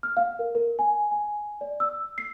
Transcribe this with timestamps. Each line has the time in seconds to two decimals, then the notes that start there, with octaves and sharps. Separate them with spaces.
0.03 F6
0.17 F5
0.39 A#4
0.55 A#4
0.79 G#5
1.11 G#5
1.61 D5
1.80 E6
2.18 C7